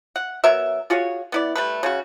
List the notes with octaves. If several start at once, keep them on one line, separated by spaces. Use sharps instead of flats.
F#5
F#3 B3 A#4 E5
F4 F#4 G#4 C#5
B3 E4 D5
G3 A3 B4
C#3 C#4 F#4